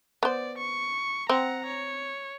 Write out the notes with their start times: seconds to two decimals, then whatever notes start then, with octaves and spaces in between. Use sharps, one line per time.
0.23 B3 C5 D5
0.58 C#6
1.29 C4 F#5 A#5
1.66 C#5